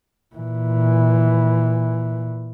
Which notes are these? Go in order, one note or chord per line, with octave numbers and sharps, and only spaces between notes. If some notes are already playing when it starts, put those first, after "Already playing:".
A#2 E3